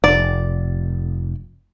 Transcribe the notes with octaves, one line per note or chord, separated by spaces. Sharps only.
F1 D5